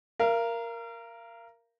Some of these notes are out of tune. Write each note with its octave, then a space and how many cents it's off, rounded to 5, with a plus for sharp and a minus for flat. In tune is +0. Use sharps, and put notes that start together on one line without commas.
A#4 +0 F5 -35